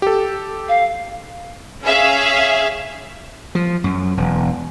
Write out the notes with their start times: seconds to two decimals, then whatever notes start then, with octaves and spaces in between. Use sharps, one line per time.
0.02 G4 A4
0.69 F5
1.83 C#4 G#4 E5 F5
3.55 F3
3.84 F#2
4.17 E1